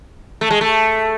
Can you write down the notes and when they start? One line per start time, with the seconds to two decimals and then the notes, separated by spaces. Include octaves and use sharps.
0.41 A3
0.51 G#3
0.61 A3